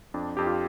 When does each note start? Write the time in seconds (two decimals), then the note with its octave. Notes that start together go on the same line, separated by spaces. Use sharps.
0.14 F2 D4
0.37 F2 G4
0.47 F4